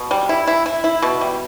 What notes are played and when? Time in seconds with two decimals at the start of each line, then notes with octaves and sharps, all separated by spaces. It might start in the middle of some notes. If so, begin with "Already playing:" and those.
Already playing: B2
0.11 G3
0.29 E4
0.47 E4
0.66 E4
0.84 E4
1.02 B2
1.21 G3